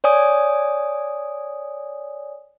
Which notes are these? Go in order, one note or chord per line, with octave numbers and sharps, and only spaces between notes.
C#5 D5 G#5 D#6